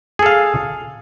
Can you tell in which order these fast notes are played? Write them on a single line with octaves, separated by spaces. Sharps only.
G#4 A4 F5